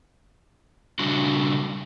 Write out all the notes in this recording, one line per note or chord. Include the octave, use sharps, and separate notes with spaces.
C#3 G3 A3 D4 F#4